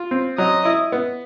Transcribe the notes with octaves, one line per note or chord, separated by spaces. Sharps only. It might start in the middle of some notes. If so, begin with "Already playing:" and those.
Already playing: F4
C4
F#3 D#5
E4
B3